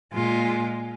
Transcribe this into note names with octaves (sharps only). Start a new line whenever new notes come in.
A#2 G#3 F4